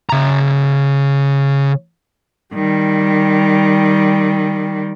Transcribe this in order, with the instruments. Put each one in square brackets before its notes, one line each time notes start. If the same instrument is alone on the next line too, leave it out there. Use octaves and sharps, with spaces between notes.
[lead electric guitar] C#3 A#5
[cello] D#3 G3